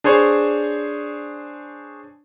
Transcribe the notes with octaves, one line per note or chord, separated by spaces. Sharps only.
D4 G#4 C5 C#5